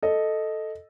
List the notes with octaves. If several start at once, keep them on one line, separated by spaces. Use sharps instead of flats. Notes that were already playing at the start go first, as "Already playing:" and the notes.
A4 D#5